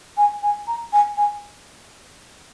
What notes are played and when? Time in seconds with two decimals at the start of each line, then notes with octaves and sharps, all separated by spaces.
0.17 G#5
0.43 G#5
0.68 A#5
0.93 G#5
1.17 G#5